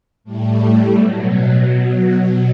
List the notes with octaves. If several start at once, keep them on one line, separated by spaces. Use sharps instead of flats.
A2 G3 A3
B2 F#3